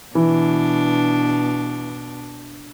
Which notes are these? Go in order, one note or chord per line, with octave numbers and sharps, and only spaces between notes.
B2 E3 D4